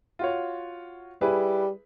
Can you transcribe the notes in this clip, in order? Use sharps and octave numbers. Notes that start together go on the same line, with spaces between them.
F4 F#4 C#5
G3 E4 G#4 B4